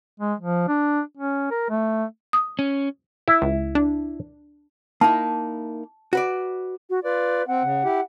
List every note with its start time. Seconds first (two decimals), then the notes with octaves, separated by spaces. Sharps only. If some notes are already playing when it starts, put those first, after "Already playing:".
0.20 G#3
0.40 F3
0.68 D4
1.17 C#4
1.51 A#4
1.70 A3
2.33 D#6
2.59 C#4
3.28 E4
3.42 C#2
3.75 D4
5.01 A#3 D#4 E4 A5
6.13 F#4 B4 D5
6.90 F#4
7.04 F4 B4 D5
7.48 C4 F#5
7.63 C#3
7.84 E4 G4